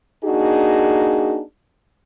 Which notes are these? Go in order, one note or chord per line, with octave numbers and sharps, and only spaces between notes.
A#3 D4 D#4 F#4 G#4